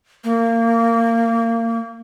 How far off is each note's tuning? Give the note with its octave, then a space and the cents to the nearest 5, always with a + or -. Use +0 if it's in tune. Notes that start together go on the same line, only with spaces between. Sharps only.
A#3 -25